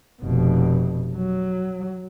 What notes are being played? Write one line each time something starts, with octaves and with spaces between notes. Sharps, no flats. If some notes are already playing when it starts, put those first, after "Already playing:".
F1 B2
F#3